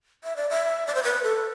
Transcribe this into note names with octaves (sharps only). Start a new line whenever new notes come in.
E5
D5
E5
D5
C5
B4
A4